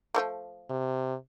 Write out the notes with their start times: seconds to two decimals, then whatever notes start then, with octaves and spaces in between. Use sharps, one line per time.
0.15 F3 A3 A#3
0.70 C3